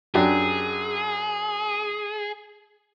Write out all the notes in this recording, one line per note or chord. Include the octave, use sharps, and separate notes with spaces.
F#2 D4 G4 G#4